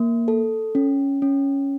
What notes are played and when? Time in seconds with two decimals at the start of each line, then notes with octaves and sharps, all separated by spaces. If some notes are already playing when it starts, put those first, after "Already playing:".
Already playing: A#3
0.28 A4
0.75 C#4
1.22 C#4